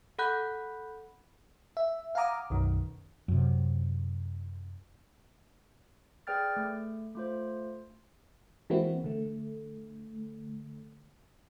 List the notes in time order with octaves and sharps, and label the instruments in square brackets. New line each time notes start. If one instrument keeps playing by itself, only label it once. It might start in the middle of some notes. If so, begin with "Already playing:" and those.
[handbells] A4 F#5 B5 F#6 G6
[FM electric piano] E5
F5 F#5 G#5 A#5 D6 D#6
B1 F#2 D#3
[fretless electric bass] F#2 C3
[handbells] G#4 B4 D5 G5 F6 A6
A3
A3 F4 C5
[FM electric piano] E3 G#3 A#3 C4 E4 F#4
D3 A3